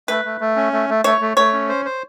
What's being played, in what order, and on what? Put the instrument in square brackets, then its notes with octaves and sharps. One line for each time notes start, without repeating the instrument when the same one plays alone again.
[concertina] A3 [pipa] B4
[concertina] A3
A3
C#4
A3
A3
[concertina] A3 [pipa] C#5
[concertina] A3
[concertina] A3 [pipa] C#5
[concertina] C#4
C5
C5